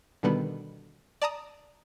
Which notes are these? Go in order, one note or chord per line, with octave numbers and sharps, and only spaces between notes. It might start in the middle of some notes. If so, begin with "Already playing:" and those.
B2 D3 D#3 G3 B3
D5 A5 A#5 D#6